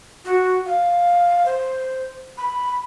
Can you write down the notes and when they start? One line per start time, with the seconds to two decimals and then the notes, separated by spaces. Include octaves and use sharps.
0.25 F#4
0.66 F5
1.46 C5
2.38 B5